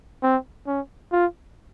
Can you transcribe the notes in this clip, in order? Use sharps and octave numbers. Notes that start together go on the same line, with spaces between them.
C4
C#4
F4